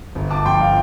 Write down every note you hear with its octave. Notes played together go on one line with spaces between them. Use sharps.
G1
A5 D6
F3 G5 C6
F5